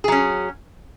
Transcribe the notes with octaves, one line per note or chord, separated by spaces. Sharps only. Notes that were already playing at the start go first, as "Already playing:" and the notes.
F#3 C#4 G#4